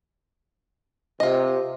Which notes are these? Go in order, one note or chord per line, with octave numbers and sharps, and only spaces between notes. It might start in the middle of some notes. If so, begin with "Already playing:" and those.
C3 F4 D#5